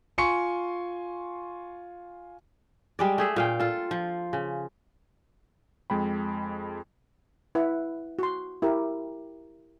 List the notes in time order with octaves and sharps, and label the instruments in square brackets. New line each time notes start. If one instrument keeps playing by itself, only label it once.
[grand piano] F4 G#5 C6 C#6 C#7
[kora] G3 G#3 D5
A3 G#4 E5
A#2 F5 G5
F4 A4
F3
C#3
[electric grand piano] F2 G#3 G5 B5
[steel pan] E4 B4 F#5
F#4 C6
E4 G4 A#4